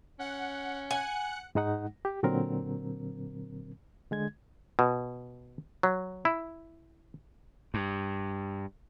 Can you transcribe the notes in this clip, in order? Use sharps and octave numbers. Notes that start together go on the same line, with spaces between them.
C#4 F#5
F#5 G#5 F#6 C#7
G#2 G#3 D#4 F#5
G4
A#2 D3 F#3 C4 A#4
D3 G#3 G#6
B2
F#3
E4
G2